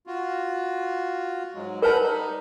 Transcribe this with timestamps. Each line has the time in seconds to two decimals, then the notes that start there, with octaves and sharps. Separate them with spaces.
0.07 F4 F#4
1.54 G#2 F#3 G#3
1.82 A#4 B4 F#5 A5 B5 G6
2.00 G3 D#4